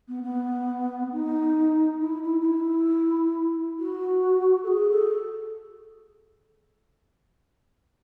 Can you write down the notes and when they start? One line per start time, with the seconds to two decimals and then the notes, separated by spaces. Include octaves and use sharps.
0.08 B3
0.23 B3
1.12 D#4
2.01 E4
2.23 E4
2.41 D#4
2.45 E4
3.79 F#4
4.63 A4
4.68 G#4
4.90 A4